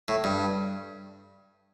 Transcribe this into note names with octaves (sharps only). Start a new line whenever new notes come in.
A2
G2